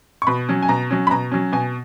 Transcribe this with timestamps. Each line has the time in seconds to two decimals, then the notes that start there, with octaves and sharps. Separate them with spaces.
0.22 C#6
0.27 B2 B5
0.49 F#3 C#4
0.63 G#5
0.69 B2 A#5
0.91 F#3 C#4
1.07 B5
1.11 B2 A#5
1.32 F#3 C#4
1.53 B2 G#5